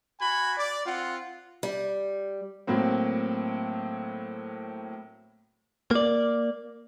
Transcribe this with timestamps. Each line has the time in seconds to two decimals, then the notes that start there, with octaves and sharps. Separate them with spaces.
0.21 F#4 G#5 B5
0.58 D5
0.86 C4 F4 F#5
1.63 G3
2.67 A2 F#3 A#3 C4
5.91 A#3 D5